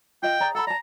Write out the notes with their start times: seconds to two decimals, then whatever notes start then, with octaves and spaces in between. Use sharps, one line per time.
0.22 F4 D#5 G5
0.40 G#4 D5 A#5
0.55 A4 F#5 A#5 B5
0.67 D5 A5 A#5